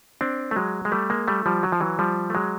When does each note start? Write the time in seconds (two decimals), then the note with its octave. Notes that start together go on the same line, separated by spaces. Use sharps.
0.21 C4 D4
0.51 A3
0.56 F#3 G#3
0.85 G#3
0.92 G3 A3
1.10 G#3 A#3
1.28 G3 A3
1.46 F3 G3
1.63 F#3
1.72 F3
1.80 E3 F#3
1.99 F3 G3
2.30 A3
2.35 F#3 G#3